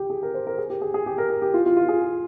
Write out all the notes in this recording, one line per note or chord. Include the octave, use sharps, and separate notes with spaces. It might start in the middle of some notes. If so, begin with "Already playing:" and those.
Already playing: G4
G#4
A#4
C5
A#4
G#4
G4
G#4
G#4
G4
A#4
A#4
G4
F4
F4
F4
G#4